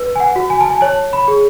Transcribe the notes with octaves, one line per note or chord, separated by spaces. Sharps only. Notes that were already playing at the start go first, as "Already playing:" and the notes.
Already playing: B4
G#5
F#5
F#4
G#5
A5
G#5
C#5 A5
B5
G#4